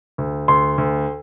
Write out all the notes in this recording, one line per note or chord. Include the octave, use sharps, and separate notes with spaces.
D2
D2 C6
D2